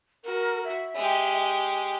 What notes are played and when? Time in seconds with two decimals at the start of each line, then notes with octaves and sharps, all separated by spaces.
0.25 F#4 A#4
0.65 E5
0.95 G#3 G4